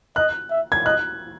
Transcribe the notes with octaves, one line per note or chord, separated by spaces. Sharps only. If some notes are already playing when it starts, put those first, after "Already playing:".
D#5 F#6
E5
G#6
D#5 F#6